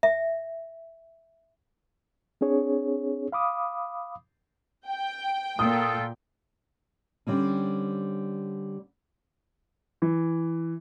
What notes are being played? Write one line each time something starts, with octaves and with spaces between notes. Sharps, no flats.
E5
C4 D4 G#4 C#5
F5 B5 D6 D#6
G5
A#2 F4 A4 D#6
D3 G3 C4 C#4
E3